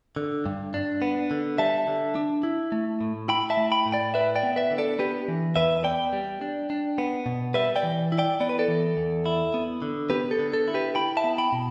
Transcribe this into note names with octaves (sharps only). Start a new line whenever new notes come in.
D3
G2
D4
B3
D3
G3 E5 A5
D3
D4
E4
A3
A2
E4 G5 B5
E5 A5
A3
G5 B5
A2
D5 G5
E4 B4 E5
D5 G5
B3
B4 E5
D3
A4 D5
B3 G4 B4
E3
E2 B4 E5
B3 D5 G5
G3
D4
D4
B3
B2
G3 B4 E5
D5 G5
E3
E4
D5 G5
B3 D5
B4
A4 D5
E3
E2
E4
B3
D3
B3 G4 B4
A4
D3
A4
E4
G4 B4
E4 G5 B5
E5 A5
B3
G5 B5
B2